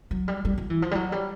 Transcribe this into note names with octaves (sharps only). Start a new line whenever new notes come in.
F#3
G3
G3
F#3
E3
F3
G3
F#3
G3